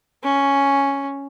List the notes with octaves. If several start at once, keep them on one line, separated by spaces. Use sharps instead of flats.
C#4